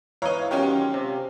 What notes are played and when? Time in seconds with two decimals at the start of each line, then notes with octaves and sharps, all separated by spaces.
0.22 E3 C#5 D#5 F5 A#5
0.51 D#3 F#3 G#3 C#4 F4 G4
0.94 C3